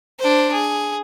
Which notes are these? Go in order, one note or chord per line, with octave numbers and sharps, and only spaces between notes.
D4 C5
G#4